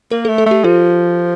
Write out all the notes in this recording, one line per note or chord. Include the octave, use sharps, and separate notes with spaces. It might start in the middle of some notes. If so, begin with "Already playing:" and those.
A#3 A#4
A3 A4
A4
A3 G4
F3 F4